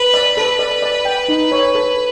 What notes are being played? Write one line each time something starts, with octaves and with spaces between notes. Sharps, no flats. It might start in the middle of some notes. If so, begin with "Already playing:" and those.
Already playing: B4
D5
A4 B4
D5
D5
G5
D#4
C#5
A4